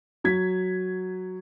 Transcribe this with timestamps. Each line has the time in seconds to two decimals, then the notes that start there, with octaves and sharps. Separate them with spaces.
0.24 F#3 G#6 B6